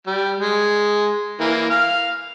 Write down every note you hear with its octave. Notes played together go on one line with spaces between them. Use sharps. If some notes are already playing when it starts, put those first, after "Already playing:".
G3
G#3
E3 A#3
F5